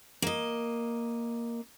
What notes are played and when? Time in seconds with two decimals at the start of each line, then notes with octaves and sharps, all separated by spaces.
0.22 A#3 D#5